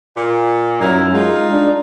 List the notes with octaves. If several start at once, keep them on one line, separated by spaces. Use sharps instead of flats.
A#2
F#2 D#4 E4 A#4
G#3 D#4 F4
D4